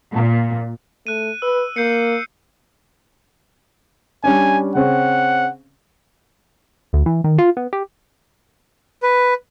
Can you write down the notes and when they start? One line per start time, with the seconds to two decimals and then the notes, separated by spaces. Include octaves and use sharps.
0.14 A#2
1.07 A3 F#6 D#7
1.42 B4 E6
1.76 A#3 G6 C7 C#7
4.24 G3 C#4 D4 G#5
4.75 C#3 C4 C#4 F#5
6.93 D2
7.06 E3
7.24 D#3
7.38 F4
7.57 B3
7.73 G4
9.03 B4